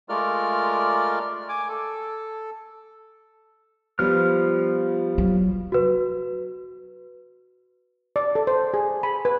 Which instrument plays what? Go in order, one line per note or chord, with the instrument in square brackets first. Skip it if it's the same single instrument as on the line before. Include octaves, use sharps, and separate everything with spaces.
[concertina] G#3 A3 F4 A#4 D5 F6
G#5 D6
A4
[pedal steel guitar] F3 F6 [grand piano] G3 B3
[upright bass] F#3
[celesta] F#4 B4
[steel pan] D5
A4
C5
G#4
B5
B4